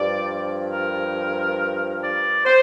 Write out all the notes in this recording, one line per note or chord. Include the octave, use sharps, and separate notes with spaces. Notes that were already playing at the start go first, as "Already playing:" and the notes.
Already playing: G2 F3 D5
A#4
D5
C5